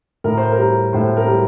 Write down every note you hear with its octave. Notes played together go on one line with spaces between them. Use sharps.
A2 A#4
C5
A#4
G3
A2 C5
A#4
G3